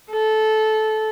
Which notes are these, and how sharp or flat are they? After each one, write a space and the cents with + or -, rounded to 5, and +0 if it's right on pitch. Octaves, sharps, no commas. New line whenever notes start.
A4 -15